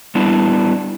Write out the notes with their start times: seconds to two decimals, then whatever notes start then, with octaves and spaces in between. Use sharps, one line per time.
0.15 G3 B3 D4 E4